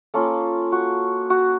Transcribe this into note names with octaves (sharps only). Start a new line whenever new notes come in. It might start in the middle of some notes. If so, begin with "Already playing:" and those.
A#3 C#4 F4 A4
F#4
F#4